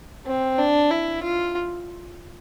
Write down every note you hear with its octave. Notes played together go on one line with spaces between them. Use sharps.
C4
D4
E4
F4